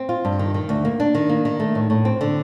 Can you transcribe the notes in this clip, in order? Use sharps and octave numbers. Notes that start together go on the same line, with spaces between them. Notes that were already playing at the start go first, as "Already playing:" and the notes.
Already playing: C4
F4
G2
D#3
D#3
D2
A#3
D4
D#3
A#3
D#3
A3
A2
A2
C4
D3